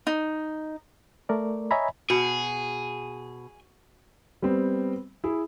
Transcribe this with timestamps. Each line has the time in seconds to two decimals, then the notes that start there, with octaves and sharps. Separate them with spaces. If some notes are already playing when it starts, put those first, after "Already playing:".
0.07 D#4
1.29 A3 A#4 D5
1.71 C#5 D#5 E5 G#5 A#5 B5
2.10 B2 F#4 G#4
4.42 G3 B3 C4
5.24 E4 G#4